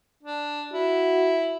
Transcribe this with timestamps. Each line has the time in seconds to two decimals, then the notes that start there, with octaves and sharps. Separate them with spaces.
0.23 D4
0.73 E4 F#4